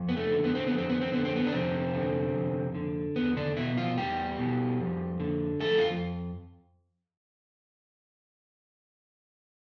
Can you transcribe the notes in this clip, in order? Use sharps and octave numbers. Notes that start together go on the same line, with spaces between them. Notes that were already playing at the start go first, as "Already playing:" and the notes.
Already playing: F2
B3
A3
D3
B3
C4
F2 B3
C4
B3
C4
D3 B3
C4
B3
D4
F2 C3 C4
D3
F2
D3
E2 B3
D3 D4
B2 E3 E4
F3 F4
E2 G3 G4
B2
F2
D3
F2 A3 A4
F4